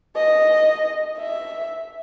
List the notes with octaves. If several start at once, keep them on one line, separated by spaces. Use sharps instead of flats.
D#5
E5